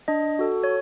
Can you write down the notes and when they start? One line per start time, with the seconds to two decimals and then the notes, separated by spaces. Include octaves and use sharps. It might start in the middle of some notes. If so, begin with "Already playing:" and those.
0.08 D4 D#5
0.39 F#4 A4
0.64 C#5